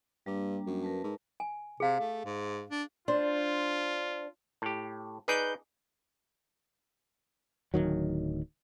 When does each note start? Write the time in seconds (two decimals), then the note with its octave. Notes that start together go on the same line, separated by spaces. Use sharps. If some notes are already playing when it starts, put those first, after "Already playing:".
0.26 G2 G3 A#3 D4
0.66 F#2
0.83 A#4 B4 A5
1.04 G#2
1.40 G#5
1.80 C3 G#4 F5
2.00 A3
2.25 G#2
2.70 D4
3.08 D4 F4 C5
4.62 A2 G4
5.28 D#4 G#4 B4 D5 G6
7.74 D1 E2 D#3 F#3